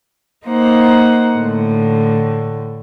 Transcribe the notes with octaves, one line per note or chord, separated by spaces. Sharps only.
A#3 D#4 C5 F#5
A2 D3